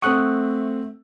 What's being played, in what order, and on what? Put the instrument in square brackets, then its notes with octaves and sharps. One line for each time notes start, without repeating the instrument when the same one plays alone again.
[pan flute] A3 [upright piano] C4 A4 F#5 [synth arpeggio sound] C#6 D#6 F#6